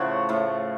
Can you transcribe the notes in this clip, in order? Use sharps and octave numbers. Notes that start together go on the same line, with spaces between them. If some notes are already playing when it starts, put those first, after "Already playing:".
Already playing: A2 C#3 F3 A3 C#5 F#5
A2 A3